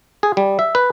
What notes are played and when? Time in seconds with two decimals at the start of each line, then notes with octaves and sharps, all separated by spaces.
0.23 G#4
0.37 G3
0.59 E5
0.75 B4